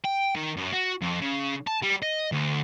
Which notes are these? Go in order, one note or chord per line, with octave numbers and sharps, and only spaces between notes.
G5
D#3
F#2
F#4
F2
C#3
A5
G3
D#5
D2